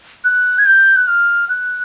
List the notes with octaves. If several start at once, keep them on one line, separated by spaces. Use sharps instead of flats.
F#6
G#6
G6
F#6
F6
F#6